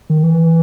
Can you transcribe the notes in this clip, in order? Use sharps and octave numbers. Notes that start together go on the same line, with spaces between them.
D#3
E3